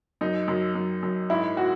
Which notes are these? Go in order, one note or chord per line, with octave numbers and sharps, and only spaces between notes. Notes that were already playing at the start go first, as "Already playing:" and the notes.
F#2 D#4
F#2
F#2
F#2
G#2 E4
F#4